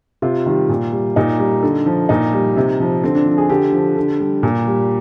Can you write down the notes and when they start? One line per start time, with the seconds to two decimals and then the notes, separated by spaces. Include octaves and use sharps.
0.22 C3 F4
0.46 D#3 G3
0.69 A#2
0.92 G3
1.16 A#2 D#4
1.39 G3
1.62 D3
1.86 F3
2.09 A#2 D#4
2.33 G3
2.56 C3
2.80 F3
3.04 D3 C4
3.15 D4
3.26 F3
3.38 G#4
3.49 D3 G4
3.73 F3
3.97 D3
4.20 G3
4.43 A#2
4.67 G3